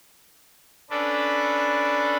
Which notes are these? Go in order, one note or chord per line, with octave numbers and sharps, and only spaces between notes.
C#4 D4 A4 B4 D5